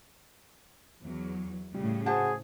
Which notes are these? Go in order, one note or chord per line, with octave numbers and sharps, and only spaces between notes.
E2 F#3
A2 C#3 G3
F#4 G#4 C5 A5